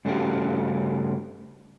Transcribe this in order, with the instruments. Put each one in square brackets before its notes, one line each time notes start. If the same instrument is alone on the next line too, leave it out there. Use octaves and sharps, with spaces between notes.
[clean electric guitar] G2 C#3 A3 C#4 F#4 G4